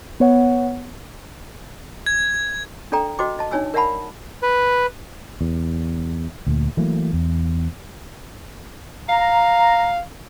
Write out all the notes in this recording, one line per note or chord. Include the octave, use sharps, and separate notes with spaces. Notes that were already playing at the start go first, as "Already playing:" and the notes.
B3 C#5 F#5
G#6
D4 A4 D5 G5 A#5
F#4 C5 D#5 G5 D6
D#5 A5
D4 D#4 C#5 G#5 E6
A#4 D5 E5 F#5 A5 B5
B4
E2
D2 A#2
E3 F#3 A3 A#3
E2
F5 A#5